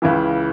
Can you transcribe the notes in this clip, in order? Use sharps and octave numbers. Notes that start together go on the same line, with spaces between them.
C#2 C#3 E3